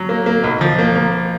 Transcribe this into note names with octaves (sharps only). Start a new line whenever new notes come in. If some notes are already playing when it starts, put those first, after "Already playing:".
Already playing: F#3
A#3
A#3
B1
F3
A#3
A#3